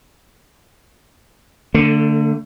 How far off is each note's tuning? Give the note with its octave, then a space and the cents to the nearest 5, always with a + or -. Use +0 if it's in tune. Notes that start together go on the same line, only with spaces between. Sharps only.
D3 +0 A3 +35